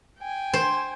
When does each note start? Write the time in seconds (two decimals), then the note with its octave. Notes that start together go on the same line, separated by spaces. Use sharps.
0.19 G5 G#5
0.54 C5